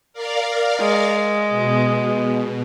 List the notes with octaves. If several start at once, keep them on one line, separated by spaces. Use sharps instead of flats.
A#4 D5 F5
G#3
B2